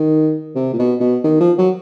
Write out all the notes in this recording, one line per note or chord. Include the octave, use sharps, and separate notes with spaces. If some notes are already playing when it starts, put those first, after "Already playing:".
Already playing: D#3
C3
A#2
B2
B2
D#3
F3
F#3